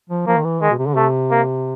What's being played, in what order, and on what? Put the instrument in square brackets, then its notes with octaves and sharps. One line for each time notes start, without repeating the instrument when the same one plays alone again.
[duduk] F3
[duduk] F3 [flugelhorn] A#3
[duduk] D#3
E3
[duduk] D#3 [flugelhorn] G#3
[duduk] B2
C3
D3
[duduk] C3 [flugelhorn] A3
[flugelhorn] A#3